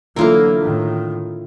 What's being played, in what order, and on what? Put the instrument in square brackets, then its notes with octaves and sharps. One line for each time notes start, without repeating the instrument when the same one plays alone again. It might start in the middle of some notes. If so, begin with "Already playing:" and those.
[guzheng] D3 E3 B3 [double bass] F#3 A#3 [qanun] E4 F4 A#4
[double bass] A2 D#3